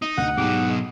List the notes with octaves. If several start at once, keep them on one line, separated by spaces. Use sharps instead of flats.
D#4 D#5
D2 F#5
B1 G#2 B2 G4
G#3